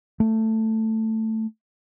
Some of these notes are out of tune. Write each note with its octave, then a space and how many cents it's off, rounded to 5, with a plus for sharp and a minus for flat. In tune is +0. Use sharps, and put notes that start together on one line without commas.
A3 +10